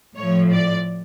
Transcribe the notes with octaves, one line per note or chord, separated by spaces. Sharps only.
A2 F3 C#5
D5